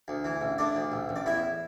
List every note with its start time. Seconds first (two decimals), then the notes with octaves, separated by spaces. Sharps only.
0.08 D2
0.25 E3
0.41 A1
0.58 A3 D4 D5
0.75 D2
0.92 A1
1.09 A1
1.16 D5
1.26 E2 E4 E5